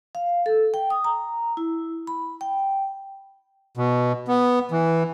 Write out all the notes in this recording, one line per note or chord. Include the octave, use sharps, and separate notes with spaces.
F5
A4
G5
D#6
A#5
E4
B5
G5
B2
B3
E3